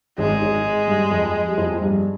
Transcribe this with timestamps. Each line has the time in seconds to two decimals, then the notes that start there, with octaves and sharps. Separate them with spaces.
0.18 G#1 G#2 G#3
0.41 G#1 G#2
0.88 G2
1.11 F2
1.47 G3
1.57 F2 F3
1.81 G2 G3